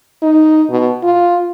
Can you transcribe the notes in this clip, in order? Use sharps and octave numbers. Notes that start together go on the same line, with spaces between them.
D#4
B2
F4